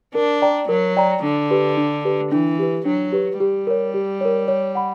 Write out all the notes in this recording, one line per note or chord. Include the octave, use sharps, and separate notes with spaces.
D4 A#4
D5 G5 A#5
F#3 A#4
D5 G5 A#5
D3 D4
G4 B4
D4
G4 B4
E3 D4
G4 B4
F#3 D4
G4 B4
G3 G4
A#4 C#5
G4
A#4 C#5
C#5
F#5 B5